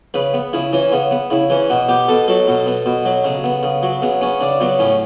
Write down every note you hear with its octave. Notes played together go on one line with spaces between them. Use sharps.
C#3 B4
B3
C#3 E4
E3 C#4
C#3 B3
B3
C#3 E4
E3 C#4
B2 B3
B3 G4
B2 A4
F#3 A4
B2
B3
B2
F#3
C#3
B3
C#3
F#3
C#3 B3
B3 C#4
C#3 D4
F#3 B3
A2 C#4